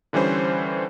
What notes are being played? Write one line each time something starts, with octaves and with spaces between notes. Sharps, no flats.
D3 E3 G3 C#4 C5